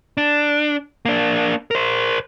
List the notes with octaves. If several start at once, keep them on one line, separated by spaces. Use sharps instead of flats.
D4
A#3 D4
A#4 C5